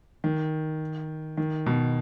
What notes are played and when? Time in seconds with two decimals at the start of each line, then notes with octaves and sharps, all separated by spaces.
0.24 D#3
1.37 D#3
1.66 B2